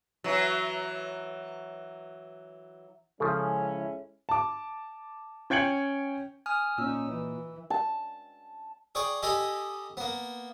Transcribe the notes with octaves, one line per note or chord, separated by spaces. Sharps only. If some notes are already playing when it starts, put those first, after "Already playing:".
E3 F#3
C#3 F3 G#3 C#4 E4 A4
A5 D6
C#4 G5 G#6 C#7 F#7
G#5 D#6 F6
A#2 C#4 D#4 E6
E3
A5
G#4 D5 G5 C#6
G4 A4 D#5 G#5 B5
A#3 B3